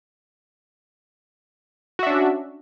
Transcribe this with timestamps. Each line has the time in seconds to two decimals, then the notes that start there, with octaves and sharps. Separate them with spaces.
1.99 F#4
2.03 E5
2.07 D4
2.10 C#4